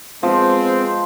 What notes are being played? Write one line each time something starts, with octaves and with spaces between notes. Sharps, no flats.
F3 G#3 B3 C4